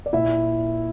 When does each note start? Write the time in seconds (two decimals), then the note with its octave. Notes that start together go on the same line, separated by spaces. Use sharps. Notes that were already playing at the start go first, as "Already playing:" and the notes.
0.06 D5
0.13 A#2 E4 E5